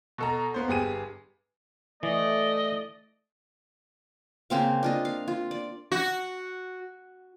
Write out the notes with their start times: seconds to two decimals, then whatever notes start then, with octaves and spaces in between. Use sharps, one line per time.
0.18 B2 A4 A#5
0.54 A#3 B3 C5
0.68 G1 G4 G#4 D#7
2.03 E3 A3 D5 D#5
4.50 C#3 A#3 C4 F5
4.83 D4 F4 D#5
5.05 F5
5.28 F4
5.51 D5
5.92 F#4